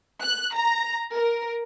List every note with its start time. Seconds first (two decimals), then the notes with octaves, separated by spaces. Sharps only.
0.22 F#6
0.54 A#5
1.14 A#4